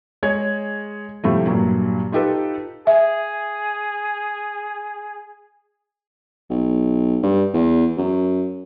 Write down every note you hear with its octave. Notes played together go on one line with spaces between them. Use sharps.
G#3 C#5 G#6
A2 C3 F3 G3 A3
G2 A#2 F#3
D#4 F4 G4 A4 B4
G#4 E5
B1
G2
E2
F#2